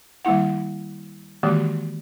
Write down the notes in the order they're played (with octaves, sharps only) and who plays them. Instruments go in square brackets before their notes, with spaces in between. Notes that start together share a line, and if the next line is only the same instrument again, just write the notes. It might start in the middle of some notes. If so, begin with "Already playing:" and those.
[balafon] D#3 G3 A#3 E4 F#5
D#3 E3 G#3 A#3 F#4 G4